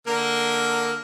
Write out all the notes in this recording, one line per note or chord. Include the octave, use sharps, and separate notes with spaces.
D3 A#3 A#4